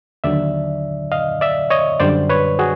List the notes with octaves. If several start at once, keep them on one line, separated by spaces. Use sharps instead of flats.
D#2 D3 F#3 D5 E5
D#5 F5
D5 E5
C#5 D#5
F#2 D3 G3 C5 D5
B4 C#5
F#4 G#4